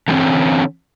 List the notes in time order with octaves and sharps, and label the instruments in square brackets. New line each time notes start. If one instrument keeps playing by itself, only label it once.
[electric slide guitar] D3 E3 A#3 C4 C#4